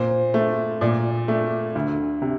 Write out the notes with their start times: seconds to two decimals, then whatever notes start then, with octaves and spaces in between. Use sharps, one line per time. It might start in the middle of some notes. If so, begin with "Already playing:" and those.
Already playing: A#2 C5
0.34 A3
0.81 A#2 D5
1.28 A3
1.75 D2
2.22 C3